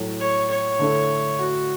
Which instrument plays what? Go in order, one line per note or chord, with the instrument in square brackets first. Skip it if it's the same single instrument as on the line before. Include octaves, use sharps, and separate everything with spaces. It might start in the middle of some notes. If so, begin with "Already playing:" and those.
Already playing: [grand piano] A2 F#3 A3 A4
[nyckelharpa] C#5
C#5
[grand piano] D3 A3 E4 A4
[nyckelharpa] F#4